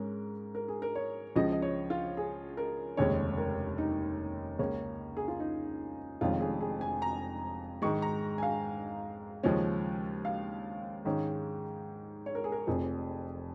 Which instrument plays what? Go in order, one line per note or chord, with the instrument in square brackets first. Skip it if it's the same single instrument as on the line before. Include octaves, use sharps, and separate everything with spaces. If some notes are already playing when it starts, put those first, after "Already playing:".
Already playing: [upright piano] G#2 G#3 C#4 A#4
A#4
G#4
A#4
C#5
C#2 C#3 F3 D#5
D#5
C#5
F4
G#4
A#4
F1 D#2 C#3 G#3 C#4 C#5
A#4
D#4
C#2 C#3 A#3 C#4
G#4
F4
D#4
F1 F2 D#3 G#3 C#4 F4
G#4
G#4
G#5
A#5
G#2 D#3 G#3 C#6
A#5
G#5
F5
D#2 C#3 F3 G#3 C#4
F5
G#2 D#3 G#3 C#4
C#5
A#4
G#4
A#4
F1 F2 F3 G#4